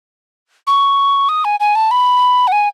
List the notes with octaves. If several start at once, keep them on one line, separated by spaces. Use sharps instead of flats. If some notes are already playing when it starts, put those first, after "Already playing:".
C#6
D#6
G#5
G#5
A5
B5
F#5
G#5